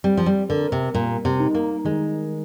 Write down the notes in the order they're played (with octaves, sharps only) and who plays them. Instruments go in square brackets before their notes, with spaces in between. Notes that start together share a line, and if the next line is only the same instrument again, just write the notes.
[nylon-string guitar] G3 [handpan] C4
[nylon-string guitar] F3
G3
[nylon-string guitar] D3 [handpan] A#4
[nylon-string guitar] C3
[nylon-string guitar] A#2 [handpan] G3
[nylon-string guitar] C3
[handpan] D#4
[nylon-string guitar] A#3
[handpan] D#3 [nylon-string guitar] G#3